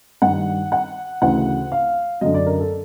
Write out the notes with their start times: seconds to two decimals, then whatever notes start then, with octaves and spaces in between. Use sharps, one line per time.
0.22 G2 D#3 F#5
0.72 F#5
1.22 D2 C#3 E3 F#5
1.72 F5
2.21 F#2 D3 D#5
2.34 D5
2.46 A#4
2.59 A4